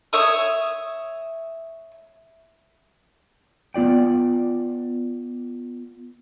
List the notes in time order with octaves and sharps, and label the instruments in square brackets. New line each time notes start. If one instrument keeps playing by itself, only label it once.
[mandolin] C#5 E5 D#6
[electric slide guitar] B3 F4 D5 G5